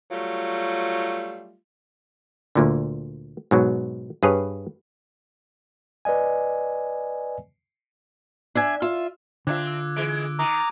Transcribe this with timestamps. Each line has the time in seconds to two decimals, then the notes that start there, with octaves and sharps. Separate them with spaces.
0.11 F#3 G3 A3 F4
2.55 D2 A#2 D3
3.51 G#2 B2 F#3
4.23 G2 G#4 B4 C#5
6.05 B4 D5 D#5 G#5
8.55 D4 E5 G#5
8.82 F4 E5
9.47 D3 C4 D4 F4 E5 D6 F#6 G#6
9.67 E6
9.96 E3 G#3 D7
10.39 D#3 A#5 D6 D#6 D#7